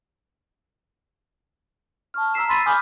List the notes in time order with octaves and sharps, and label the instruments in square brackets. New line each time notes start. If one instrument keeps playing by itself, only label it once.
[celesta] A5 C#6 F6
A#5 E6 F6 B6 C7 E7
B5 C6 A6 B6 D#7
G#5 B5 D6 D#6 F6 G6